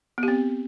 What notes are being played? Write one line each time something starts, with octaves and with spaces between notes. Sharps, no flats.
B3
G4
C4